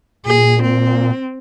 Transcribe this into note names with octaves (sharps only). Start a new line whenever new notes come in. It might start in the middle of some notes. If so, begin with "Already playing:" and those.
A#2 G#4
C4